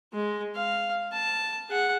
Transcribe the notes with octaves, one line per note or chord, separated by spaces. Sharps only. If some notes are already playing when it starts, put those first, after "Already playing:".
G#3
F5
A5
G#4 F#5